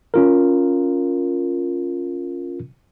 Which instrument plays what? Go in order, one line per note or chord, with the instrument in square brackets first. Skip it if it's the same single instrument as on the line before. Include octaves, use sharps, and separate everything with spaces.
[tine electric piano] C#4 F4 A#4